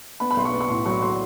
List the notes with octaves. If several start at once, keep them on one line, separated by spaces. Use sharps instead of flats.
B3 B5
B5
B1 C6
C#6
B3
C#6
A2 C6
F#3 C#6
F#3 C6